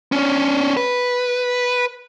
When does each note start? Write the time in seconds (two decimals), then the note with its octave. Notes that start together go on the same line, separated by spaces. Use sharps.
0.12 C#4 D4
0.77 B4